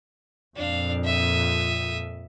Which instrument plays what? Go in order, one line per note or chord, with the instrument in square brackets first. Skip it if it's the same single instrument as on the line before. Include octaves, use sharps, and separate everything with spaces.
[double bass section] F2 A#2 [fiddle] D4 F5
[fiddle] E5 D#6